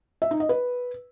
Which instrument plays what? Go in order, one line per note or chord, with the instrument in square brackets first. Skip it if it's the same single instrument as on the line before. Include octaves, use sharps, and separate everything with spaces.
[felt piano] E5
D#4
D#5
B4